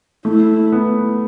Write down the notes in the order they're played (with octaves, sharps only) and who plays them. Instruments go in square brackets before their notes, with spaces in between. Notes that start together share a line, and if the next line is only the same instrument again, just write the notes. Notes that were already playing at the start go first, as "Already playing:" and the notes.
[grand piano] A3 [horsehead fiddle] E4
[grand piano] B3